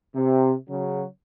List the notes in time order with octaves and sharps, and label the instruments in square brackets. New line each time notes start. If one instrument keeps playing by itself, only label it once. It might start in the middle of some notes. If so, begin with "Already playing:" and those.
[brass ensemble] C3
C#3 F#3